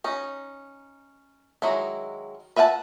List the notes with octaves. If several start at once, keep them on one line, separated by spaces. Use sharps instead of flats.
C#4 D#4
D#3 F#3 G#3 E4
B4 E5 F#5 G5 A5